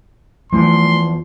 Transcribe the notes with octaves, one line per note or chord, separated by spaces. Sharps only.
E2 F3 F#3 A3 C6